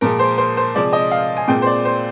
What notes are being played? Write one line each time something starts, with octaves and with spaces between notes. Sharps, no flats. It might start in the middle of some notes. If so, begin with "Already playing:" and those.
A#2 F3 G#3 A#4
C5
C5
C5
C3 F3 G#3 C4 D5
D#5
F5
G#5
A#2 G#3 C4 G5
C5
D5
C5